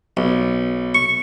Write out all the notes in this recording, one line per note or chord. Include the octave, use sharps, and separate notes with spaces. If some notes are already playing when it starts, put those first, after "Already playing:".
B1
C#6